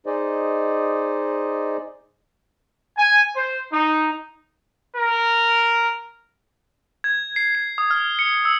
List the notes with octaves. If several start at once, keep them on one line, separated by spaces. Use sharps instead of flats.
D#4 G#4 C5 D5 D#5
G#5
C5
D#4
A#4
G#6
C7
C7
D#6
F6
C#7
E6